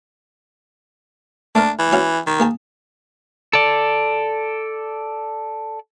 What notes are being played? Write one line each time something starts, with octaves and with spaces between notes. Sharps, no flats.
A3 D4 A#4
E3
C#4 F#4 F5
D#3
A#3 G#4 A5
A4 D5